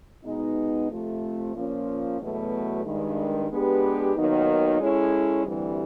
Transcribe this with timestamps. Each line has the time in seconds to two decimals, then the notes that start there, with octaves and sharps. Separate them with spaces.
0.24 B2 G#3 B3 D#4
0.90 F2 C3 F3 A3
1.54 A#2 F3 A#3 C#4 F4
2.20 E2 B2 F#3 A3
2.85 G2 D#3 G#3
3.50 G#3 B3 D4 G4 B4
4.15 D#2 D#3 F#3 B3 D#4
4.80 G#3 C#4 E4 A4 C#5
5.45 D2 C3 E3 G3